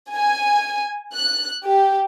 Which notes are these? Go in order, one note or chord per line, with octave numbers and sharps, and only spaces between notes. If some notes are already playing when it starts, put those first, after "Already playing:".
G#5
F#6
G4